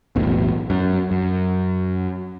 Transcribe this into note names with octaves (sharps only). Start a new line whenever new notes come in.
E1 B1 E2 A2
F#2
F#2